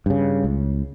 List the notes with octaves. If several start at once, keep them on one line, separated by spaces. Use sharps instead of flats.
G2 C#3
C#2